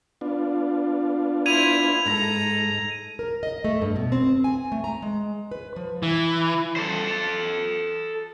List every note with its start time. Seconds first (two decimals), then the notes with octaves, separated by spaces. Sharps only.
0.21 B3 D4 F4
1.46 E4 C5 G#6 D#7 F7
2.05 G#2 A4 A#5
3.19 A#4
3.43 D#5
3.65 A3
3.82 G2
3.96 B2
4.12 C4
4.44 G#5
4.72 A3
4.84 A#5
5.03 G#3
5.51 B4
5.76 F3
6.03 E3
6.76 A4 C5